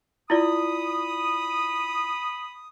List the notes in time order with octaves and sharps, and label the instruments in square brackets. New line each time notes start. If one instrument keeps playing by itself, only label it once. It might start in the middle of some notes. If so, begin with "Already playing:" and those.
[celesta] E4 F4 D5 [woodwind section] B5 D#6